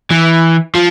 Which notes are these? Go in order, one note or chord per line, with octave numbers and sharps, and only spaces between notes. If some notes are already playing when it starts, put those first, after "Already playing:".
E3
F3